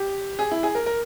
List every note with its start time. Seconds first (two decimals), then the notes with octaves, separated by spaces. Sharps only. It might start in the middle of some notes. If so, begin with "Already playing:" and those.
Already playing: G4
0.39 G#4
0.51 E4
0.63 G#4
0.75 A#4
0.86 A#4